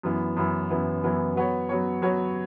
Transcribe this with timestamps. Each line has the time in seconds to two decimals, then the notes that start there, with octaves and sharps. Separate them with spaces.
0.03 F#2 E3 B3 E4
0.37 F#2 E3 B3 E4
0.70 F#2 E3 B3 E4
1.03 F#2 E3 B3 E4
1.36 F#3 B3 F#4 C#5
1.69 F#3 B3 F#4 C#5
2.02 F#3 B3 F#4 C#5